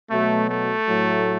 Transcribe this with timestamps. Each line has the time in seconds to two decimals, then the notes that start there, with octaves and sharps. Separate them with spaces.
0.11 B2 F#3 A3
0.49 A3
0.88 A2 F#3